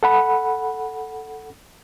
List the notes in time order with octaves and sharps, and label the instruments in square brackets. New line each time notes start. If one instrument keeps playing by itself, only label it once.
[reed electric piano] A4 F#5 B5